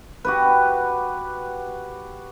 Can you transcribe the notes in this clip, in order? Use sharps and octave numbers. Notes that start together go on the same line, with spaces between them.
F#4 G4 B4